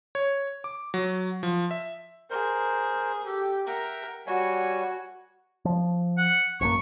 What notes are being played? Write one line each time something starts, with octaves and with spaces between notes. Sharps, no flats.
C#5
D6
F#3
F3
E5
G#4 A#4 C5
G4 A4
A#4 E5 F#5 G5
G3 F#4 C#5 G#5
F3
F#5
A1 F#2 A#3 C#6